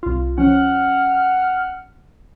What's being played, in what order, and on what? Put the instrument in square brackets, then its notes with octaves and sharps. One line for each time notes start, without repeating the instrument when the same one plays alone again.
[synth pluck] C2 F4
[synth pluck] F3 C#4 [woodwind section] F#5 F6